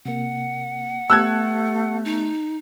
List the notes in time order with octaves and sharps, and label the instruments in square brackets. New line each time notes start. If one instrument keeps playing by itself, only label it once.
[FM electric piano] C3 A#3 [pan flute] F#5
[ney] A3 [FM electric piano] B3 G4 A5 [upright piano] E6 F#6 G#6
[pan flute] D#4